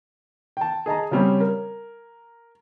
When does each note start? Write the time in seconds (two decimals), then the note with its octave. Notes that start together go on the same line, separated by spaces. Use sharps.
0.57 G5 A5
0.86 G#4 D#5 A5 A#5
1.11 C#3 F#3 G3 C4 C#4
1.40 A#4